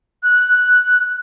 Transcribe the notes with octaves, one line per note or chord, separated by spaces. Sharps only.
F#6